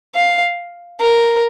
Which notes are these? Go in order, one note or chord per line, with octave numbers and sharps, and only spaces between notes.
F5
A#4